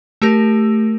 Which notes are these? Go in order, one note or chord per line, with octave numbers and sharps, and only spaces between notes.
A3 G4 A#4